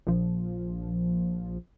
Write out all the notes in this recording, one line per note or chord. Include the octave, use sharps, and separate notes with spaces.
A#1 F3